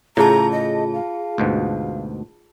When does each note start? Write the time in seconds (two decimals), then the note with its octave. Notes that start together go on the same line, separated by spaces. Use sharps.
0.17 A2 C#3 F4 G#4 A5 A#5
0.52 D#5
0.94 F5
1.38 D2 G#2 B2